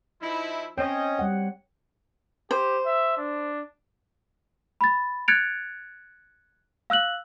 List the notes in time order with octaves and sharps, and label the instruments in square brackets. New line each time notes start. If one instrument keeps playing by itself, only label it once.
[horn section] F3 D#4 E4
[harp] C4 G5 [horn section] C#4 D#5 [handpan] C#5
[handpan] G3 F#5
[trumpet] G4 [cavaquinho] C5
[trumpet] E5
D4
[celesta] B5 A6
F#6 G#6 A6 C#7 D7 F7
F5 E6 F#6 F#7